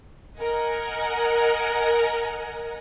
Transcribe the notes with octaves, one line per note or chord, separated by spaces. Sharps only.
A#4 D#5 F#5 G#5